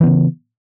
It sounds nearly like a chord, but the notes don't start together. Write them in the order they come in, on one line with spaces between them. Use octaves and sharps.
E3 B3 C#3